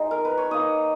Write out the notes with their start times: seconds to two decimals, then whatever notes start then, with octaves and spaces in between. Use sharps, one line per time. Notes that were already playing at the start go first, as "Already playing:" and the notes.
Already playing: G#3 D#4
0.11 A#4
0.25 B4
0.38 C#5
0.51 A#3 D#4 D#5